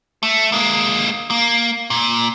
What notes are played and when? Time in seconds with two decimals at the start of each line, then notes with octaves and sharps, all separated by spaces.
0.23 A3
0.52 G#3 A#3
1.30 A#3
1.90 A#2